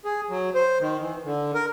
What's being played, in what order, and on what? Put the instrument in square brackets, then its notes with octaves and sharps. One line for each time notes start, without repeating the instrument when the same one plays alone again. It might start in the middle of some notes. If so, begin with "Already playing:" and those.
[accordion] G#4
F#3
C5
D#3
E3
D3
A#4